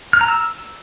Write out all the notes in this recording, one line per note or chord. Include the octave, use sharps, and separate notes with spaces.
F6
A#5
E6